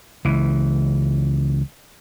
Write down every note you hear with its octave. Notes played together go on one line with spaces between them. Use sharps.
C#2 E3